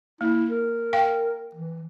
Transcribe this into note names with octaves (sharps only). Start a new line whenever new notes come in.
A#3 E4
A#4
F5 G5
E3